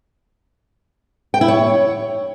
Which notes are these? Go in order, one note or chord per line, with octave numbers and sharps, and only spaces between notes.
G5
E4
C#5